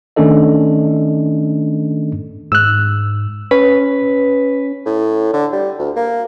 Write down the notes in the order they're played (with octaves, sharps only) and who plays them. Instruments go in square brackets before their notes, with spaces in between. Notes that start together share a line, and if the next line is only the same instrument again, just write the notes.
[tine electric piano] D#3 A3 C#4 D4 A4 D#5
[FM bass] G#2 [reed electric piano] E6 F#6
[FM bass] C#4 [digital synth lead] B4
[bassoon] A2
D3
G3
D2
A#3